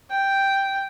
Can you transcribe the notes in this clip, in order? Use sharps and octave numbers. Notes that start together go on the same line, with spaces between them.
G5